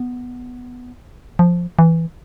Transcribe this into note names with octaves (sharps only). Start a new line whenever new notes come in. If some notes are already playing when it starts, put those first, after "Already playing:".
Already playing: B3
F3
E3